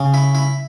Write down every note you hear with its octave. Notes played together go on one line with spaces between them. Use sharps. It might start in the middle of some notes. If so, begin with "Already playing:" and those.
Already playing: C#3
E4
E4